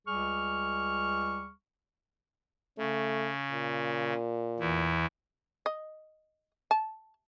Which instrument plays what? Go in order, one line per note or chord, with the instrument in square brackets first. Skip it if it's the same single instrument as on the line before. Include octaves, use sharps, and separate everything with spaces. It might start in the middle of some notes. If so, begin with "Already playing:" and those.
[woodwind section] C#2 G3 G#4 C#6 F6
[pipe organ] C#3 [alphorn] A3
[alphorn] A#2
[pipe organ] E2 E3
[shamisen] D#5
A5